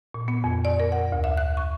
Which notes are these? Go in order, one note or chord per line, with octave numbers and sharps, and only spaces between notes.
A#2
B3
F2
D5
A#4
F#5
D2
E5
F#6
C#6